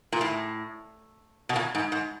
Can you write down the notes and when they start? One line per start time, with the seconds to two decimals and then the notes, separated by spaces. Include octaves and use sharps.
0.12 A#2
0.21 A2
1.49 B2
1.56 A#2
1.75 G#2
1.92 G#2